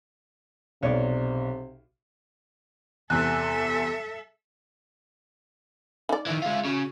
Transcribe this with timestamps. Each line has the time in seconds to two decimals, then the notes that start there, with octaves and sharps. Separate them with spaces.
0.83 B1 C3 C#5 D5
3.10 E2 C3 A4 E5 F#6
6.09 D#4 D5
6.27 D#3 E3 E5
6.42 G#3 F4
6.65 C#3 F#4